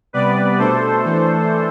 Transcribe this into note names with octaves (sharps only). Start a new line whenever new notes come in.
C3 G3 B3 B4 D5
B2 A3 D4 A4 C5
E3 A3 D4